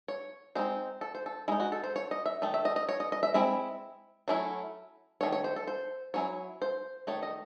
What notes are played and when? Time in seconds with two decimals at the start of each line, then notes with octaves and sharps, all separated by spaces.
0.08 C#5
0.55 G#3 C4 D#4 C5
1.01 A4
1.15 C5
1.26 A4
1.48 G#3 E4
1.52 D#4
1.60 F#4
1.72 A4
1.84 C5
1.96 C#5
2.11 D#5
2.26 E5
2.42 D#3 A3
2.54 E5
2.65 D#5
2.76 D#5
2.89 C#5
3.00 D#5
3.12 D#5
3.23 E5
3.34 G#3 C4 E4 E5
4.28 F#3 A3 C#4 E4
5.21 D#3 A3 C#5
5.32 C#5
5.44 C5
5.56 A4
5.67 C5
6.14 F#3 C#4 E4 C#5
6.62 C5
7.07 D#3 A3 C#5
7.23 D#5